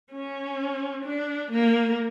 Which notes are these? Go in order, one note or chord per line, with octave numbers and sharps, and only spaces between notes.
C#4
D4
A#3